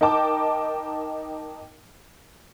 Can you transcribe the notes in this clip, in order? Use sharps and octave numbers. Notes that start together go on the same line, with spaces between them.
D#4 A#4 G5 A5 D6